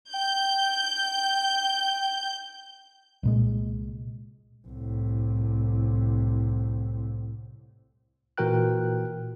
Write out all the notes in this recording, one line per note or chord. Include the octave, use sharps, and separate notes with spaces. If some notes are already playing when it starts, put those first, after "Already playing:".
G5 G6
C2 A#2 G#3
C2 A2
A#2 E3 F#4 A#4 G5 F#6